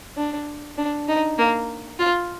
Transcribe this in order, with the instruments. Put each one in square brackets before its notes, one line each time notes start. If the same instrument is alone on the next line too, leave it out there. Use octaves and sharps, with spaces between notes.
[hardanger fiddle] D4
D4
D#4
A#3
F4